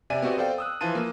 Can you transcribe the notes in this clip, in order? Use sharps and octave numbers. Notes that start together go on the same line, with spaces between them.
C3 D5 E5 G#5 D#7
B3 C4 F#4 G4 D5 D#5
A4 C5 D5 F5 G5
D#6 E6 F#6
E3 F3 F4 A5 D#7
A#3